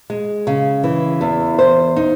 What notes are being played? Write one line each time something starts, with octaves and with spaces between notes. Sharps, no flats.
G#3
C#3
E3
E2
C5
D#4